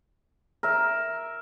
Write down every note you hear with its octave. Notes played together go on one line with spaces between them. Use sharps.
A#4 E5